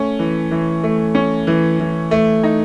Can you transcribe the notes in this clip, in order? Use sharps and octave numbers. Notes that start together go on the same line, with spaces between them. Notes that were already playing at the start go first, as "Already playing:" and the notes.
Already playing: A3 C#4
E3
E3
A3
C#4
E3
E3
A3
D#4